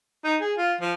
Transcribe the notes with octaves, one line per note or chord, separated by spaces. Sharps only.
D#4
G#4
F4
F3